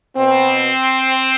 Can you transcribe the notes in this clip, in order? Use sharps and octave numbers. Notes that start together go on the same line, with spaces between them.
B2 C4